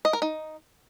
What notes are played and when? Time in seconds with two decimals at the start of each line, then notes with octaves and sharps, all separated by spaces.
0.05 D#5
0.13 A#4
0.22 D#4